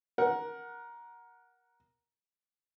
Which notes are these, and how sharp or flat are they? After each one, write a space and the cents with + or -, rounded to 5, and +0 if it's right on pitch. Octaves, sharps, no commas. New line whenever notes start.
A#4 +15 F#5 +0